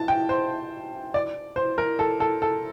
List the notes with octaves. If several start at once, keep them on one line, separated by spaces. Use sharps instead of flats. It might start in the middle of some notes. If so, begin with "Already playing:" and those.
Already playing: A5
G5
C5
D5
C5
A#4
A4
A4
A4